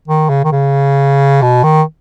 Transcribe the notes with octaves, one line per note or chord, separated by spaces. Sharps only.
D#3
C#3
D#3
C#3
B2
D#3